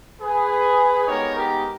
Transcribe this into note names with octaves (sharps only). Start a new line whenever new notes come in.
G#4 B4
G#3 B3 D#4 G4 A#4 C#5
G4 A#4